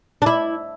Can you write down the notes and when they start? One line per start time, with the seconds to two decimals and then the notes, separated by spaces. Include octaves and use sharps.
0.22 D4
0.26 E4